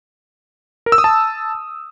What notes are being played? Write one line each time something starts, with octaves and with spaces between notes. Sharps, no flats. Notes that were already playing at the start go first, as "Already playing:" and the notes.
A#4
E6
D#6
A5